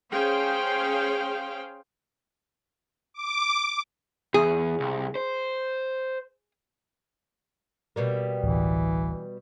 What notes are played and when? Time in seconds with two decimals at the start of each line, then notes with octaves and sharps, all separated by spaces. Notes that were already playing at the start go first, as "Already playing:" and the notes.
0.12 C#4 G#4 C5 F5 G5
3.14 D6
4.34 E2 G#4
4.80 C2
5.15 C5
7.96 B2 G3 A#3
8.44 D1 A1 E3